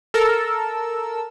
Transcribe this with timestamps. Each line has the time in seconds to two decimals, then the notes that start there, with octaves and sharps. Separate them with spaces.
0.14 A4 A#4 E6